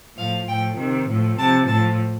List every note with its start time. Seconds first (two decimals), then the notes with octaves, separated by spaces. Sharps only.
0.17 A2 F3 F5
0.47 A2 F3 G5
0.77 C3 D#3
1.08 A2 F3
1.38 C3 F3 A5
1.68 A2 F3 A5